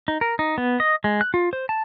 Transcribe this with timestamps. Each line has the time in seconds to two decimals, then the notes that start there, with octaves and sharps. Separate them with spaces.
0.08 D#4
0.21 A#4
0.39 D#4
0.58 B3
0.80 D#5
1.04 G#3
1.21 F#6
1.34 F4
1.53 C5
1.69 A5